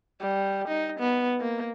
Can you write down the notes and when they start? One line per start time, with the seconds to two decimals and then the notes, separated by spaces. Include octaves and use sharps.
0.20 G3
0.68 D#4
1.00 B3
1.41 A#3